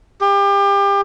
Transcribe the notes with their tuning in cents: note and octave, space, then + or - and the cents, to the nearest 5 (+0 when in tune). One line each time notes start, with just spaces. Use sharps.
G4 +30